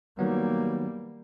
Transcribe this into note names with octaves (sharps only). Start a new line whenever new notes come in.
D#3 F#3 G3 A#3 B3